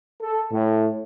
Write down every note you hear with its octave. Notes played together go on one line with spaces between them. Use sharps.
A4
A2